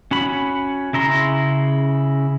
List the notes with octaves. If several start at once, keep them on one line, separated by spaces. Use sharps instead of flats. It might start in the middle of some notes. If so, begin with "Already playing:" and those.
C#4 F#4 B5
C#3 E4 A#5 C6